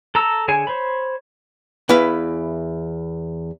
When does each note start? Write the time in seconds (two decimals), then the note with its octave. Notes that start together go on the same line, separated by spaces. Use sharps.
0.15 A4 A#5 E6
0.48 D3 G#4 C#5 G#5
0.67 C5 C#5 B5
1.89 E2 E4 B4 F5